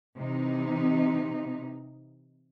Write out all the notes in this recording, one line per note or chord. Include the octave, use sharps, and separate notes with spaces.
C3 E3 D#4